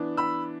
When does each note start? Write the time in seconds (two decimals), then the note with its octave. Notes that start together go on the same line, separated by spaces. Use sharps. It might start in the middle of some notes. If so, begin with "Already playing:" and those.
Already playing: E3 B3 D4
0.17 B5 E6